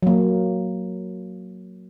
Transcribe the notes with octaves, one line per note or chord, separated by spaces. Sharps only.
F#3 A#3